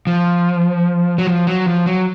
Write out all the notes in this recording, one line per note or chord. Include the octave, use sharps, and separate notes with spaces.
F3
F#3
F3
F#3
F3
F#3